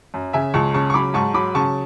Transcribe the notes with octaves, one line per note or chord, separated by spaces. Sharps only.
F#2
C#3 E5 G#5
C#2 A5 C#6
C#3 A5 C#6
C#6
F#3 B5 D6
G#2 A5 C#6
F#3 B5 D6
C#3 A5 C#6